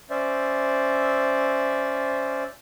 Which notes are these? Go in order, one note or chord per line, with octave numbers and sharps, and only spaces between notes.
C#4 C5 D5 E5